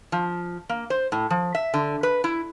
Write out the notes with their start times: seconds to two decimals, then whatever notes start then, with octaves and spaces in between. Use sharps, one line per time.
0.12 F3
0.69 A#3
0.90 C5
1.12 A2
1.30 F3
1.55 E5
1.74 D3
2.03 B4
2.24 E4